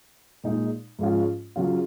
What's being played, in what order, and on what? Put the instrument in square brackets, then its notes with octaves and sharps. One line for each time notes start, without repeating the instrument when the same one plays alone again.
[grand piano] A#2 G#3 D#4
G#2 F3 G#3 C#4 F4
C#3 F#3 C#4 F4